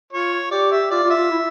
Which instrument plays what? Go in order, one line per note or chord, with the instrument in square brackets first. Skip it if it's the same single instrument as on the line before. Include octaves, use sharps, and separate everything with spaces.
[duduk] F4 [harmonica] C#5
[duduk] G4 [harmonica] D5
[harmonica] E5
[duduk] F4 [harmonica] D5
[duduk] F4
[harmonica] E5
[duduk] F4
E4